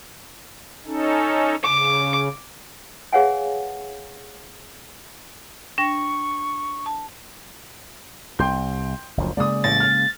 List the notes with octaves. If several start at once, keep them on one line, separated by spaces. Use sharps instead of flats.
C#4 D#4 A4
C#3 D6
G#4 B4 C#5 F5 F#5 G#5
D4 G5 C#6 A#6
A5
C2 G5 C6 G6
F#1 D2 F3
C#3 G#3 A#3 D5 D#6
A1 A6 A#6
F6